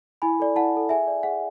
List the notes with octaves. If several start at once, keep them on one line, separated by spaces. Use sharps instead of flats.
E4 G#5 B5
A4 D5
E4 F#5 A5
A4 D5
G#4 E5 G#5
D5
G#4 F#5